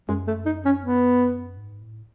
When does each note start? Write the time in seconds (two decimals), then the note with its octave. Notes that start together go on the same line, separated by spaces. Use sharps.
0.08 F#2 G#3
0.27 A3
0.46 D#4
0.65 C#4
0.83 B3
1.57 G#2
1.81 A2